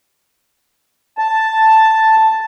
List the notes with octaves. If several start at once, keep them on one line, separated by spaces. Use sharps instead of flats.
A5